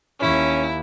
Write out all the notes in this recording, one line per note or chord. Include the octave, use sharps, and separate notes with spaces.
D#2 C#4 E4